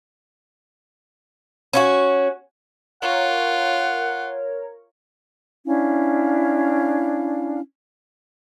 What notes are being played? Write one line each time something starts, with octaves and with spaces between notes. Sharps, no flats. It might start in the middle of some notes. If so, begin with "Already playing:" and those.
C#4 F4 F#4
F4 A#4 C#5 F#5
C#4 D4 E4 F5